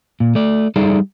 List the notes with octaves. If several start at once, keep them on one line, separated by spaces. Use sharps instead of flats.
A#2
A3 D5
G3 D#4 G#4 A4 D5 E5